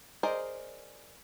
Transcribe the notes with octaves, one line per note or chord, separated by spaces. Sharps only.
G#4 A#4 C5 D5 D#5